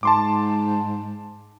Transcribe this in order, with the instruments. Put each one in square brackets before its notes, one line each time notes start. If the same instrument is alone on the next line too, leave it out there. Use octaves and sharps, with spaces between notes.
[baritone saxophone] G#2 [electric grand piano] A5 C6 D6